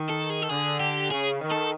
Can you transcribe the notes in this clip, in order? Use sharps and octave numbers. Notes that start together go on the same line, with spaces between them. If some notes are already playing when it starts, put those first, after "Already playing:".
Already playing: D#3
A4
G#4
A4
D3 G#4
G4
C#3 G#4
D#3
A4